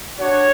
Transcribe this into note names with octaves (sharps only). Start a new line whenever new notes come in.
D4 F#4 C#5